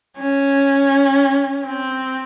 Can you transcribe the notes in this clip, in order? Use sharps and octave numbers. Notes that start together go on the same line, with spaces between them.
C#4
C4